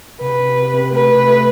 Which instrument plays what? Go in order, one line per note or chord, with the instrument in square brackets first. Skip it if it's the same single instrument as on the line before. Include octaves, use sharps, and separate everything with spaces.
[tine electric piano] C3 [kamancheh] B4
[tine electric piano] C3
C3
C3
[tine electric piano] A3 [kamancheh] B4
[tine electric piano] C3
A3